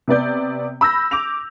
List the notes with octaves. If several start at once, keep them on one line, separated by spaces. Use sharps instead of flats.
C3 B3 D5 G6
B5 E6 G6 A#6
D6 G6 F7